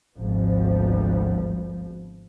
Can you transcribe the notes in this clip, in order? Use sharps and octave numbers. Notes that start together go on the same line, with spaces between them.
G#1 D2 F3 B3